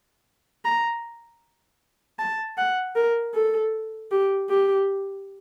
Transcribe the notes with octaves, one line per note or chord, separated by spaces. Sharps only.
A#5
A5
F#5
A#4
A4
G4
G4